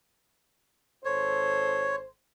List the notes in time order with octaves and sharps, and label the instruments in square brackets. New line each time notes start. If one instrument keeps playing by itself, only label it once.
[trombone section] G#1 A4 C5 [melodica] C#5